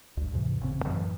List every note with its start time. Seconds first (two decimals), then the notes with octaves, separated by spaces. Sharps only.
0.17 D2 G2
0.33 E2 G#2 C3 E3
0.61 A1 C#3 C4
0.85 F#2 A2 E3